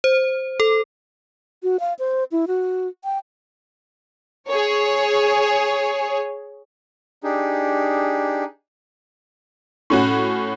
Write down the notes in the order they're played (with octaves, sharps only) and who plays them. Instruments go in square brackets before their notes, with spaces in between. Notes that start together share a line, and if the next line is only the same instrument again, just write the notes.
[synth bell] C5
A4
[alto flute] F#4
F5
C5
E4
F#4
G5
[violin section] G#4 C#5
[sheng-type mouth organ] D4 D#4 G4 G#4
[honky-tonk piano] A2 C#4 F#4